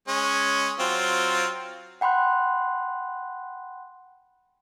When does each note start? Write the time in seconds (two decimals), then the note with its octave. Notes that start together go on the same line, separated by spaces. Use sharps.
0.08 G#3 C#4
0.80 F#3 C4 F4
2.01 F#5 G5 B5 C6 F#6